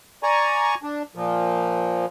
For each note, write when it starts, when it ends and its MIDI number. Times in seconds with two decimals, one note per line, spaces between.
0.23 0.75 74
0.23 0.75 80
0.23 0.75 82
0.23 0.75 85
0.83 1.03 62
1.15 2.06 46
1.15 2.06 53